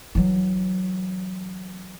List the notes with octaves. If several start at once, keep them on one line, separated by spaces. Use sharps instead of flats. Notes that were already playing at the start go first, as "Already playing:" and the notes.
E3 F#3